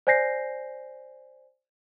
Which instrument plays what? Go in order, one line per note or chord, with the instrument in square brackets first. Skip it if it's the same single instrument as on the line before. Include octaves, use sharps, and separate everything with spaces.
[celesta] C5 D5 G#5 G6 A#6 C7